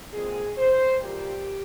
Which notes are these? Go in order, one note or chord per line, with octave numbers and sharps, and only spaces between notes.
A#2 G#3 C4 G#4
C5
A#2 G3 A#3 G4